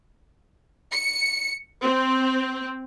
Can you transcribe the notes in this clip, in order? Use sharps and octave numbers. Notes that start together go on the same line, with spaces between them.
C#7
C4